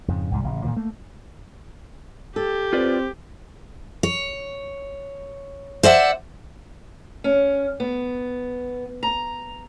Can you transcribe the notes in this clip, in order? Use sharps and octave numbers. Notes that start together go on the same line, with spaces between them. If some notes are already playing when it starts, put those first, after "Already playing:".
F2 G#2 C#3
C2 G#2 G3
A1 C#3
G2 A#2 D#3 F3
A3 A#3
G4 A4
C4 F4 B4 D5
C#5
C5 D5 E5 F#5
C#4
B3
A#5